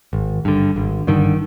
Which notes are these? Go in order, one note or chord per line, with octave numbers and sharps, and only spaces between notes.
G#1
G2 D3
G#1
G2 D3 D#3